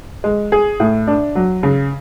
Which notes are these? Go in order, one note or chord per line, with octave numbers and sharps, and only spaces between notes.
G#3
G#4
A2
D4
F#3
C#3